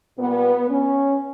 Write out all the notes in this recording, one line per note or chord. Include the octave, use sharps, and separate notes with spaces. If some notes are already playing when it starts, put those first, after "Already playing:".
A#2 G3 B3
C#4